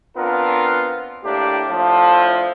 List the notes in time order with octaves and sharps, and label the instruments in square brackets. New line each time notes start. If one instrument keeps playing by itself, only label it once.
[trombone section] B3 C4 D4 F4 A#4
A2 A#3 D4 G4
A2 D3 F3